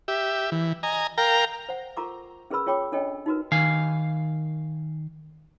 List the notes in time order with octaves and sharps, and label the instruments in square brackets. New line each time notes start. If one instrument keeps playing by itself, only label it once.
[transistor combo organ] G4 E5
E3
D#5 G#5 A#5
A#4 F5 G5 A#5
[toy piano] C5 F#5
F4 A4 A#4 A#5 C#6 D6
C#4 G#4 A#4 B4 B5 E6
F4 G#4 C#5 G5 B5 D6
C#4 D4 A4 C#5 D#5 G5
D#4 F4 F#4 A#4 B4
[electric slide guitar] D#3 F5 G#5